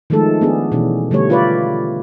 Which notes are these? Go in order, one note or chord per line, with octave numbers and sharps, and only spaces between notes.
D#3 F3 G#3 A3 A4
B3 D4 G#4
B2 E3 C#4
D3 G3 A3 C#5
F4 B4 D5